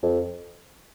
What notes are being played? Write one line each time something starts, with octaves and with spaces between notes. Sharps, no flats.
F2